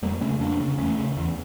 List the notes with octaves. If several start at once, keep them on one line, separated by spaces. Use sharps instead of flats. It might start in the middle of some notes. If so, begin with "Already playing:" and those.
F2 G3 A#3
C#3 A3 C#4
F2 A#3 D4
C#3
E2 A3 C#4
C#3
E2